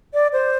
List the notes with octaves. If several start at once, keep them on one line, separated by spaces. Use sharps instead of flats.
D5
C5